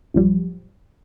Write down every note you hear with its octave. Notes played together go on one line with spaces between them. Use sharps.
A#1 F#2 F3 G3